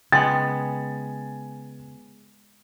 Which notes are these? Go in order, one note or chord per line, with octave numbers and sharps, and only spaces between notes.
C#3 G#3 B3 G5 G#5 C6 A6